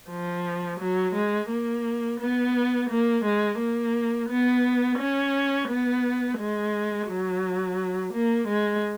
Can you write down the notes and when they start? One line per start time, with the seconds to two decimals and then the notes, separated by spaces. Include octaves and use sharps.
0.10 F3
0.80 F#3
1.14 G#3
1.50 A#3
2.20 B3
2.90 A#3
3.24 G#3
3.59 A#3
4.29 B3
4.99 C#4
5.68 B3
6.38 G#3
7.08 F#3
8.13 A#3
8.48 G#3